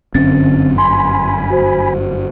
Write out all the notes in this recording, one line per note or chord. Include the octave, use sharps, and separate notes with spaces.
G1 F#2 D3 C4 C#4 A6
G#5 B5 C6
F#4 C5